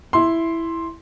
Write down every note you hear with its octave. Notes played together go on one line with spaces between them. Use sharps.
E4 C6